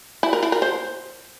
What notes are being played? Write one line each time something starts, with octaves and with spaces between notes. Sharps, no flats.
E4
A#4
E4
A#4
C5